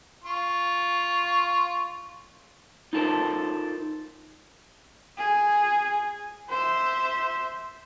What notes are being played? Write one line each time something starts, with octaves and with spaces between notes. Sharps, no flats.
F4 C#6
D#4 F4 A4 A#4 C5
G#4
C5 E5